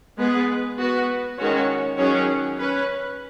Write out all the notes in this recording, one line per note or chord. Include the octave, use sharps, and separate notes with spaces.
G#3 B3 G#4 B4
B3 F#4 B4
D#3 G#3 C#4 F#4 C#5
D#3 F#3 C#4 G#4 C#5
C#4 B4